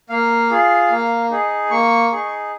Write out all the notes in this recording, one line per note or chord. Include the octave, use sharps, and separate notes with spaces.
A#3 F5
F4 G#4
A#3
D#4 G#4
A#3 C#6
D#4 G#4